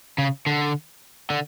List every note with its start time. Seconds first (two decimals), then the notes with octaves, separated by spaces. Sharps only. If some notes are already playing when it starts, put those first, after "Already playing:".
0.18 C#3
0.46 D3
1.30 D3